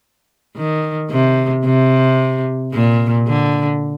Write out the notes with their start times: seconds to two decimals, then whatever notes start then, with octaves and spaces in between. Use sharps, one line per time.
0.56 D#3
1.11 C3
1.65 C3
2.73 A#2
3.27 D3